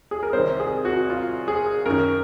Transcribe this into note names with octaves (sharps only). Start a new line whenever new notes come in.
G#4
A#4
C2 C3 D#3 C5
G#4
F#4
F4
G#4
F#2 D#3 A#4